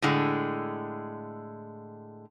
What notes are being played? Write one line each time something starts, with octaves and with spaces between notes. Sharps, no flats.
A2 D3 G#3